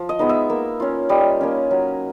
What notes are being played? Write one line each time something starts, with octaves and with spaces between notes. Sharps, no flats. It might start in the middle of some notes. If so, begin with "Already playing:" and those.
Already playing: F3
D#5
G#3 B3 D#4
E5
A#3
C#4 F4
G3 D#5
A#3 C#4
F#3